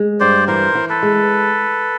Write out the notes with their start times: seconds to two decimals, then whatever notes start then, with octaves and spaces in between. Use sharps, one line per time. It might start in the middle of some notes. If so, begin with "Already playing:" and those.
Already playing: G#3
0.20 G2 C5 D5
0.47 E3 A#4 C5
0.75 E3
0.89 A4 B4
1.03 G#3